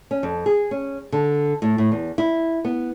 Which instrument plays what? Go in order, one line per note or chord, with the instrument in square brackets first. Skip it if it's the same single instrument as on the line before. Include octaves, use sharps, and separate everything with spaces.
[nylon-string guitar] C#4
F2
G#4
C#4
D3
A2
A2
E2
E4
B3